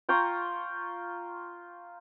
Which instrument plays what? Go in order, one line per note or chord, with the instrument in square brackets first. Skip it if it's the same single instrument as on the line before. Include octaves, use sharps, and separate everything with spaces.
[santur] F4 G5 A#5 C#6